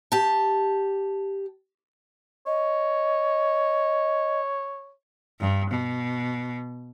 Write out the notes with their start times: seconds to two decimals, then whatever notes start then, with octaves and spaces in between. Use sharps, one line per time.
0.12 G4 A5
2.47 C#5 D#5
5.40 G2
5.70 B2